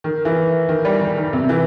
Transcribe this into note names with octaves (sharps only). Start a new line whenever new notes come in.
D#3
E3
D#3
G3
D#3
D#3
C3
E3